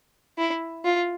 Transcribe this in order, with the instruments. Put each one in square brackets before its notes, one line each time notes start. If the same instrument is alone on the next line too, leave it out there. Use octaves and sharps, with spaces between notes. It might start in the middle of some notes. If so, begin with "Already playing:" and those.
[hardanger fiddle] E4
F4